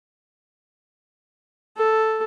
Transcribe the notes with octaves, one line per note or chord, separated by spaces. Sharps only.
A4